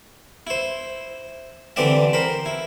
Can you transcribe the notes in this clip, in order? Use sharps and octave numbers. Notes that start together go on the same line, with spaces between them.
E4 C5
D3 E3 C4 G4 D5 E5
A#4 C5 B5
E4